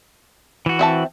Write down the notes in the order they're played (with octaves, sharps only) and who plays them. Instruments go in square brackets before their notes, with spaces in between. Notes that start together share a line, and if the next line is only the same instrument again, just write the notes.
[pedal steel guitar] E3 F#4
[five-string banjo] C4 E5 A5